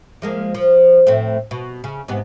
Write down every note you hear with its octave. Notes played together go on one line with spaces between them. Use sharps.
F3 G#3 A#3
F3
A2 A3 C4
B2
C#3
G#2 C3 B3